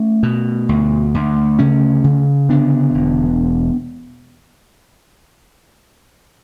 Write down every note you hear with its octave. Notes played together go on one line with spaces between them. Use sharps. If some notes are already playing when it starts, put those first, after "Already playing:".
Already playing: A3 C#4
B2
D2
D2
C#3 A3 C#4
C#3
D3 B3 D4
E1